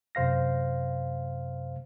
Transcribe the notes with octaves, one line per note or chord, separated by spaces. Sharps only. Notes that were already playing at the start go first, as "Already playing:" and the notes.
F#2 C3 C5 F5 A#6